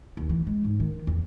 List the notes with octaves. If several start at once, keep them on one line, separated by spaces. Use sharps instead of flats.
D#2
E3
G#3
G#2
D#3
E2